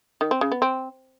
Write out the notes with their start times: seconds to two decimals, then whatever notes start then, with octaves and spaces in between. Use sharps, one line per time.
0.21 D#3
0.31 C4
0.41 C#3
0.52 B3
0.62 C4